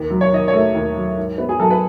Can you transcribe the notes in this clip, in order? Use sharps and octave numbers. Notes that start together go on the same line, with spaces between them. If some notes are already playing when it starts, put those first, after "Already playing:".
Already playing: D#2
F#3
C#5
D#3 D#5
C#5
A3
D#2
F#3
G#2
B3
G#4
F#3 A4
B4